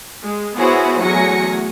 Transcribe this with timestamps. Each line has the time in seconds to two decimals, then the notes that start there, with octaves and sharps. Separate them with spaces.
0.24 G#3
0.57 B3 E4 F#4 G#4 C5 C#5
1.02 E2 F#3 A3 G#5 A#6 C#7